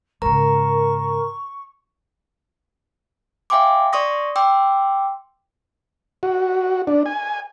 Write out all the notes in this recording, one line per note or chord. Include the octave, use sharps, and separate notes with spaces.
G#2 C#3 A#4 A#5 C#6
E5 F5 G5 G#5 C6 D6
D5 C6 C#6 D#6 A#6
G5 C6 D6 E6
F#4
D4
G#5